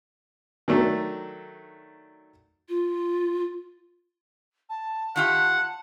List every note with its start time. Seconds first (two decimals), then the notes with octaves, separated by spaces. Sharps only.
0.68 D#3 F#3 A3 D4
2.69 F4
4.69 A5
5.16 D#3 F4 G4 F#5